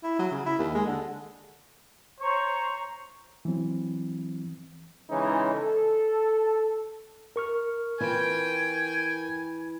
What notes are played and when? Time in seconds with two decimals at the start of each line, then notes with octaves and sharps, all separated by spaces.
0.03 E4
0.19 F#3
0.31 C#3
0.46 E4
0.59 D#2
0.75 G#3
0.86 D3
2.20 C5 C#5 A#5 C#6
3.45 E3 F#3 C4
5.10 C#3 E3 G#3 C#4 D#4
5.54 A4
7.36 A#4 C#6 F6
8.01 E3 C4 F4 G5 G#5